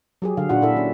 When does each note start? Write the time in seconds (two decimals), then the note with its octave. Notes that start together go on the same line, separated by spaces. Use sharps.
0.22 F#3 G4 G#4
0.37 D3 F#3 F5
0.49 A#2 D4 F4 F#4 F#5
0.62 A#2 E4 A4 E5
0.77 C#4